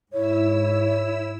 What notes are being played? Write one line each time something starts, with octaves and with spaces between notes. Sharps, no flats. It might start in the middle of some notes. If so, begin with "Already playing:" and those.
G#2 E4 C#5 E6